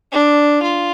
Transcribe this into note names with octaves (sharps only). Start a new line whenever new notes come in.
D4
F4